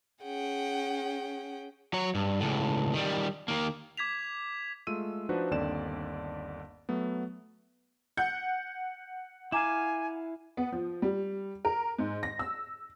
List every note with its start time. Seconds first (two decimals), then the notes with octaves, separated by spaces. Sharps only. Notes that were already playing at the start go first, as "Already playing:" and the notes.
0.23 C#4 G#4 F#5 G5
1.94 F#3 C#5
2.15 G2
2.40 C#2 A2
2.94 D#3 G3
3.48 D#3 A#3
3.97 D6 G#6 B6 F7
4.87 G#3 A3 F4 E6 D#7
5.29 F3 D4 D#4 F#4 B4 C5
5.51 G1 D#2 D3 C4 D5 E7
6.89 F#3 A3 B3
8.17 F#5 G6
9.52 E4 F5 G#5 A#5 D6 E7
10.57 B3
10.72 F3
11.02 G3
11.65 A#4
11.99 G#2
12.23 A#6
12.39 E6